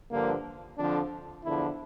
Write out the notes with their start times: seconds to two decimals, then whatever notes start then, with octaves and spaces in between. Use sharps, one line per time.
0.11 G2 D3 F3 A#3
0.78 F2 D3 F3 D4
1.44 E2 D3 F3 E4